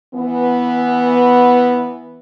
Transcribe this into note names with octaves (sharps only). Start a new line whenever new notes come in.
E3 B3